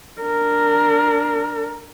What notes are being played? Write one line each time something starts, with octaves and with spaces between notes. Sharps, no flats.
D4 A#4